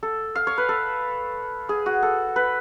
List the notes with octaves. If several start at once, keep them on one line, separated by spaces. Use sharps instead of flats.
A4
F5
C#5
B4
A4
G#4
F#4
A4
B4